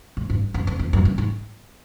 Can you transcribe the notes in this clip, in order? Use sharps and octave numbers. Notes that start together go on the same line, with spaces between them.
G#2
G2
F#2
F2
F2
F#2
G2
G#2